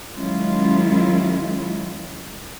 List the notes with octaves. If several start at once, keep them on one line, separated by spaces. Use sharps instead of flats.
D#3 F#3 G#3 C#4 E4 F4